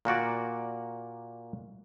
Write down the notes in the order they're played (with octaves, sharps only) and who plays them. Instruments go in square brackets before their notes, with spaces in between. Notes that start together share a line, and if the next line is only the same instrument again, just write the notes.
[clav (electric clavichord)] A#2 A#3 F#4 D5